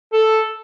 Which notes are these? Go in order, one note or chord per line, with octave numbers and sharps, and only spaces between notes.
A4